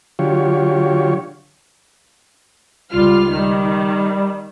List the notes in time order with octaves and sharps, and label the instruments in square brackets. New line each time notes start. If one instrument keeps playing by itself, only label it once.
[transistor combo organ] D3 F#3 F4 G4 C#5
[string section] C#2 F4 F6 [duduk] G3
[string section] D#3 [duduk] G3